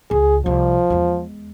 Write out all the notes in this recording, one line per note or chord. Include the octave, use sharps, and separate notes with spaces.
C#2 G#4
C2 F3
E2 G#3